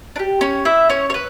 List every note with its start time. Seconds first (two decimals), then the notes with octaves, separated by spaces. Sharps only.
0.16 D4
0.19 G4
0.41 C#4 C#5
0.65 E4 E5
0.90 C#4 C#5
1.10 C#5
1.14 B4